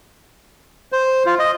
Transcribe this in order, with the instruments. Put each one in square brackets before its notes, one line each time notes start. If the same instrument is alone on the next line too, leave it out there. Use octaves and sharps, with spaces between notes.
[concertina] C5
F4
D#5